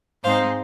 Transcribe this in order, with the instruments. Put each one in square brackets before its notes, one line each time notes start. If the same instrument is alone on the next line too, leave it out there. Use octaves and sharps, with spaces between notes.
[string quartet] G#2 G#3 C4 D#4 C5 F5